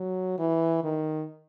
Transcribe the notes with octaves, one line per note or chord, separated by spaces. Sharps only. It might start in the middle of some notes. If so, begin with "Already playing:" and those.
Already playing: F#3
E3
D#3